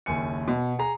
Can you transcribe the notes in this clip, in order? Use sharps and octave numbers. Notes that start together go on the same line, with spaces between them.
F#1 D#2 G#5 C#7
B2
G#4 A#5